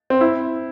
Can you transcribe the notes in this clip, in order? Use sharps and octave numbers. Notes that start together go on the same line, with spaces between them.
C4
E4